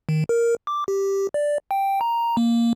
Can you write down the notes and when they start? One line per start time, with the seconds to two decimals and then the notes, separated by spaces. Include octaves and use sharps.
0.09 D#3
0.29 A#4
0.67 D6
0.88 G4
1.34 D5
1.71 G5
2.01 A#5
2.37 A#3